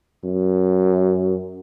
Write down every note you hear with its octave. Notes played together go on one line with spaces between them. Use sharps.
F#2